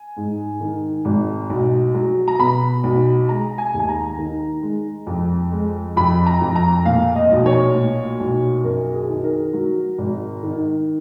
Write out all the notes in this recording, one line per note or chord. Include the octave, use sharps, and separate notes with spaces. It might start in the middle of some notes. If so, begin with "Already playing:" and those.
Already playing: G#5
G#2
D#3
G#1
B1
F#3
A#5
B2 B5
B1
G#3 A#5
G#5
D#2
G#5
A#5
D#3
G#3
F2
G#3
F2 B5
A#5
F2
A#5
A#2 F5
D#5
B1
C#5
A#2
B1
F#2 A#4
G#4
D#3
A#4
F#3
G#1
D#3